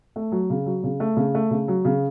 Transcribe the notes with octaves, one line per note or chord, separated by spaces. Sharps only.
A3
F#3
C#3
F#3
C#3
A3
C#3
A3
C#3
F#3
C#3